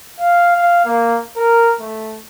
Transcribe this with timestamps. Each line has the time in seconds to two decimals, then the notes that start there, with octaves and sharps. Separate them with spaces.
0.20 F5
0.56 F5
0.85 A#3
1.37 A#4
1.80 A3